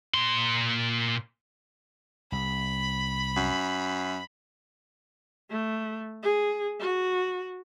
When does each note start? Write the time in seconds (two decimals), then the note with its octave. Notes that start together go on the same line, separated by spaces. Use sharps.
0.14 A#2 C6
2.32 C2 B5
3.36 F#2
5.50 A3
6.23 G#4
6.80 F#4